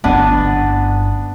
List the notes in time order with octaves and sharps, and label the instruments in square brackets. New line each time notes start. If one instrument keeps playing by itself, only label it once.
[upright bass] G1 E4 [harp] B3 D4